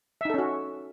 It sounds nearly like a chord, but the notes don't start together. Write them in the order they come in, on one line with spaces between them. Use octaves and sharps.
E5 D#4 A4 C#4 F#4